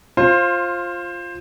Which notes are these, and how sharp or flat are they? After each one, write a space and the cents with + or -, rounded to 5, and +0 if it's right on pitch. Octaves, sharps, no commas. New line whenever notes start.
F4 +0 C5 +20